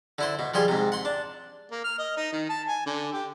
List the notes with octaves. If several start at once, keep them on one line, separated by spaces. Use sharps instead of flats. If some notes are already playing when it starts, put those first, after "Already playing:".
D3 E4 C5
B2
F3 G3 G#4 C6
G#2 C3
F#5 C6
D4
A#3
F6
D#5
D#4
D#3
A5
G#5
D3
G4